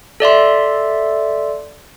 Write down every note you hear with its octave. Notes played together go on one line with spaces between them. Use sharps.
A4 D5 E5 C6